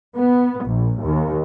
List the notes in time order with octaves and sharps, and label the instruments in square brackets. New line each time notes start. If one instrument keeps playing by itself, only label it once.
[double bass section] B3
A#1
D#2